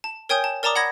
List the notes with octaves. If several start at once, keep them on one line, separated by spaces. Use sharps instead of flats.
A5
A#4 C#5 G5 G#5 D#6 G6
A5
A#4 D5 A5 A#5 D6 D#6
F#5 B5 D#6 G#6 A#6